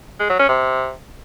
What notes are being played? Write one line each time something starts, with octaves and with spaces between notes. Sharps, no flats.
G#3
F#3
C#4
C3